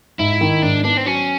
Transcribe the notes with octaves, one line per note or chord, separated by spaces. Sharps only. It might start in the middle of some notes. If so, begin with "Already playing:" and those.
G#2 E4
D#3
G#2 D4
B3 D4
C4
F#3 C#4